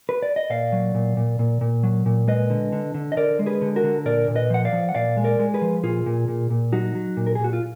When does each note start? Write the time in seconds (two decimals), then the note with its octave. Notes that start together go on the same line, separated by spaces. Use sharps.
0.09 B4
0.22 D5
0.36 D#5
0.50 A#2 D5 F5
0.72 F#3
0.95 A#2
1.17 A#2
1.39 A#2
1.61 A#2
1.83 F#3
2.06 A#2
2.28 G#3 B4 D#5
2.50 D3
2.72 D3
2.94 D3
3.12 D#5
3.17 D3 A#4 D5
3.39 G#3
3.46 G#4 B4
3.61 D3
3.76 F#4 A#4
3.84 D3
4.05 A#2 A#4 D5
4.28 A#2
4.35 B4 D#5
4.50 F3 F#5
4.65 D5 F5
4.73 F3
4.89 F#5
4.95 A#2 D5 F5
5.17 G#3
5.24 A#4 D5
5.39 G#3
5.54 G#4 B4
5.62 F3
5.83 A#2 F4 G#4
6.06 A#2
6.28 A#2
6.50 A#2
6.73 F#3 D#4 F#4
6.95 F#3
7.17 A#2
7.26 A#4
7.35 A#2 G#4
7.44 F#4
7.53 F4